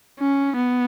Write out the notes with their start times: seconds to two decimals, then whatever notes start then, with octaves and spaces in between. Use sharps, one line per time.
0.20 C#4
0.56 B3